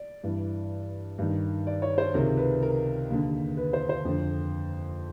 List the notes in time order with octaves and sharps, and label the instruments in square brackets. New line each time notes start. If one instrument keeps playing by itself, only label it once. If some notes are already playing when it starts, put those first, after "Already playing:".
Already playing: [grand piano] D5
G2 E3
G2 D#3
D5
C#5
C5
C#2 C3 D#3 A#4
B4
A#4
D#2 D3
B4
C5
C5
F2 D3